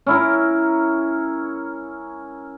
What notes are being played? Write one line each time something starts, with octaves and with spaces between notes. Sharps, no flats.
C#4 E4 A#4